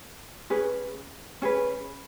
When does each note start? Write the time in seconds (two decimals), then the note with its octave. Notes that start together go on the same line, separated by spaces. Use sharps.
0.50 C#4 G#4 B4
1.42 C#4 G#4 B4